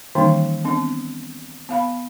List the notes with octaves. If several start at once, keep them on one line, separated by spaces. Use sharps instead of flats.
D#3 E3 G3 A#3 C#4 D#4
B3 C4 D4
B3 F5 B5